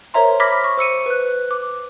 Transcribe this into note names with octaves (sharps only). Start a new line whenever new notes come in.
A#4 C5 C#5 E5 A#5 C6
B5 D6 F6 G#6 A#6 B6
C#6
C5 E6 C#7 D#7
B4 F#6
D6